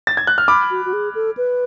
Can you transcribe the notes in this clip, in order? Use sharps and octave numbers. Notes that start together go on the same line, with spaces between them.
A6
G#6
F#6
F6
B5 D6
F#4
F#4
G#4
A4
B4